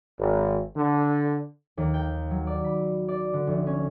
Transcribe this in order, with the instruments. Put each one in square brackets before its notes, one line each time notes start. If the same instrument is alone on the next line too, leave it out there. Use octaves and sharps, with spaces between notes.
[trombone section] G#1
D3
[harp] D#2
G5
F#3
D5
B5
D5
D3
F1
C#4